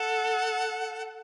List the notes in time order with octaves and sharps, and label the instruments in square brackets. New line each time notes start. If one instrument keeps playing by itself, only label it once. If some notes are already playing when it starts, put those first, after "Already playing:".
Already playing: [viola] A4 [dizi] F#5